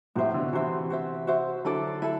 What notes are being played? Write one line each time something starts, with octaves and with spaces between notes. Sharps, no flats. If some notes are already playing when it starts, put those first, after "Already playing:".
A2 C3 F#4 C5 E5
B2 D3
C3 E3 F#4 C5 E5
F#4 C5 E5
F#4 C5 E5
D3 F#3 E4 A4 D5
E4 A4